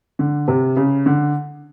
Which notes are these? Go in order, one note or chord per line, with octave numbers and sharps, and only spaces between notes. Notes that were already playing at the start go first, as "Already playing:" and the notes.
D3
C3
C#3
D3